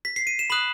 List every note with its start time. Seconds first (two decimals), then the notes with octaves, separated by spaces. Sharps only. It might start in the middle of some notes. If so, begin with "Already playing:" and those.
0.05 B6
0.16 C7
0.27 D#7
0.39 E7
0.50 B5 D#6 F#6 F#7